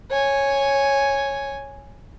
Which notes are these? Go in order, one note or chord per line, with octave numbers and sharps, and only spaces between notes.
C#5 G#5